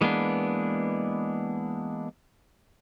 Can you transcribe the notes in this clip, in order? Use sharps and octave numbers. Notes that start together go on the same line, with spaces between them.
E3 G#3 A#3 B3 D4